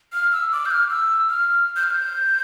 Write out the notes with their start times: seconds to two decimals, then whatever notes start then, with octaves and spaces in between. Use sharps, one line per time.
0.13 F6
0.32 E6
0.52 D6
0.66 G6
0.71 F6
0.90 E6
1.29 F6
1.76 G6
1.83 F6
1.91 G6